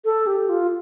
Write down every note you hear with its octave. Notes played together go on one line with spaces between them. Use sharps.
A4
G4
F4